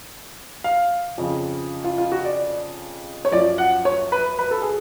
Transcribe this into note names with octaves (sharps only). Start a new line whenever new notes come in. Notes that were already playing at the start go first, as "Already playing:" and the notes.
F5
F2 C#3 F3
F4
F4
F#4
D5
C#5
F#2 F3 D5
F#5
C#5
B4
B4
A4
G#4